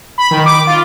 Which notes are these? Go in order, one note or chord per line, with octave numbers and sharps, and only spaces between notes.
B5
D#3
D6
F4